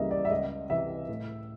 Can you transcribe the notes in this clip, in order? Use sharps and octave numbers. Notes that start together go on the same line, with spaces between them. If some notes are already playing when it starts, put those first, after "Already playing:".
Already playing: C#2 C#3 E3 G3 A#3 D#5 E5
D5
E5
C#2 D#5
C3 E3 E5
A2